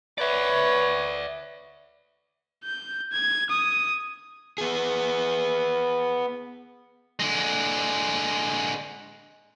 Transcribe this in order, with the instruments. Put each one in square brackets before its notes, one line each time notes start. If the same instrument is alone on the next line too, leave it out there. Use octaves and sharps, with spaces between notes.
[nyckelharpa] B4 C#5 [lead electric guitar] D5 E5
[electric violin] G6
G#6
D#6
[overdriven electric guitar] B3 G#4
D3 G#3